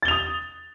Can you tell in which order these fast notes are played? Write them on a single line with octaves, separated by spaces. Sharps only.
A6 G7 F7 D#6